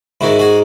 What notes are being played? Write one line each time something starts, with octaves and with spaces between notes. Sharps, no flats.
G#2 D#3 G#3 E4 F#4
F#4 G#4